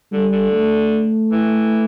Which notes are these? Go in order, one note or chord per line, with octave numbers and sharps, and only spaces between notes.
D3 G3
D3
A3
E3